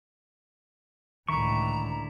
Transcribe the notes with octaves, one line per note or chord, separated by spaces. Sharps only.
C#2 A2 D3 D#3 E4 A#5 C#6